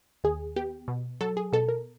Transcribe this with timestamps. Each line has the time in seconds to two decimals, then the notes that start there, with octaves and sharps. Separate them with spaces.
0.24 D#2 G#4
0.56 B3 G4
0.88 B2
1.21 F#3 A4
1.37 G#4
1.53 B2 A4
1.68 A#4